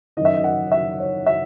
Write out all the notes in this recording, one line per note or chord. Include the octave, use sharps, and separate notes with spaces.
F#2 D#3 D#5 E5
D#5
F#5
E5
C#5
E5